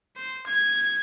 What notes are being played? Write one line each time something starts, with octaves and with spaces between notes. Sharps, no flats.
C5
G#6